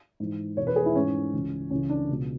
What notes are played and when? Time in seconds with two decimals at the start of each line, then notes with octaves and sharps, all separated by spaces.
0.20 G#2 E3
0.57 E2 B2 C#5
0.67 B4
0.76 G#4
0.86 E4
0.95 G#2 E3 C#4
1.33 C#2 C#3 E3
1.70 C#2 C#3 E3 C#4
1.89 D4
2.09 C#2 B2